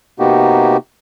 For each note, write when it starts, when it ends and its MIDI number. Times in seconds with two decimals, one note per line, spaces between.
0.20 0.77 48
0.20 0.77 58
0.20 0.77 59
0.20 0.77 63
0.20 0.77 66
0.20 0.77 67